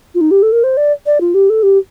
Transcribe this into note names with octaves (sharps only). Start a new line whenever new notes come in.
F4
D#4
G4
A4
A#4
C5
D5
D5
F4
G4
A4
G4